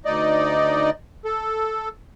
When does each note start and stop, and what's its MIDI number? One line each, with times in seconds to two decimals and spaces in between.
0.05 0.90 38
0.05 0.90 63
0.05 0.90 74
0.05 0.90 75
1.25 1.89 69